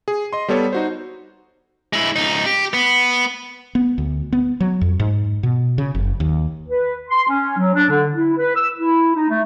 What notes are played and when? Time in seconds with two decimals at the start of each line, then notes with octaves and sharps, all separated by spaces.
0.08 G#4
0.33 D#5 C6
0.48 G3 B3 A4 C#5
0.73 D#4 F#4 C5
1.93 G#3 E4
2.16 C#2 D#4
2.46 G4
2.74 B3
3.75 B3
3.98 D2
4.33 B3
4.60 F#3
4.81 F2
5.00 G#2
5.43 B2
5.78 C#3
5.95 F#1
6.20 D#2
6.68 B4
7.09 C6
7.28 C#4
7.57 F#3
7.74 D4
7.90 D3
8.14 E4
8.37 B4
8.55 E6
8.78 E4
9.14 D#4
9.29 A3